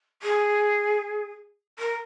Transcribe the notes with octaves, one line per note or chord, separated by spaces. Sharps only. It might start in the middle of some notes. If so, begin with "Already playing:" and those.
G#4
A#4